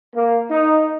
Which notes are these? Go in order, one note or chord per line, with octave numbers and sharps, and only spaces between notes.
A#3
D#4